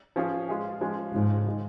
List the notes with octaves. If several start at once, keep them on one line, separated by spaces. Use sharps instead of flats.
F3 C#4 F4 G#4
G#3 F4 G#4
F3 G#3 C#4 F4
G#2 C#3 F3 C#4
D#3 G#3 D#4